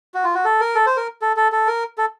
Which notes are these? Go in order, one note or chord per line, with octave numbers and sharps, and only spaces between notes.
F#4
F4
F#4
A4
A#4
A4
C5
A#4
A4
A4
A4
A#4
A4